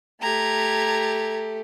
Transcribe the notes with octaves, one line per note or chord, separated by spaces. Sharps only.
A3 G4 A#5 G#6